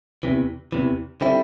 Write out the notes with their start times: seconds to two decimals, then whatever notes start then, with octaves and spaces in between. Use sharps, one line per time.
0.23 E2 C3 E3
0.72 E2 C3 E3
1.21 D3 G3 C4 E4